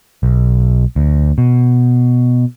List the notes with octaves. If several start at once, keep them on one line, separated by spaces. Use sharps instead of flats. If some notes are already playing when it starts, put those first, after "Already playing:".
B1
D2
B2